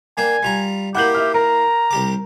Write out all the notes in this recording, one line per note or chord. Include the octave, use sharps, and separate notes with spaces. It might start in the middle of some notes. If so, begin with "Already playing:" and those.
A#3 D4 G5 G#5
G3 F4 A#5
A#3 E4 G4 F#5 G6 F#7
E5 F6
A#4 A#5
C2 G4 D6